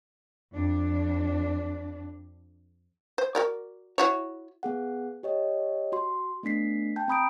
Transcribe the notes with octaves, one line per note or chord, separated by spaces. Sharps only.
F2 D4
C5
F#4 A#4 D5
E4 F#4 C#5
B3 G#4 F#5
G4 C#5 D#5
F#4 C6
A3 B3 D4 B6 C7
G5 A5 G6
C4 A#5 B5 D#6 G6 D7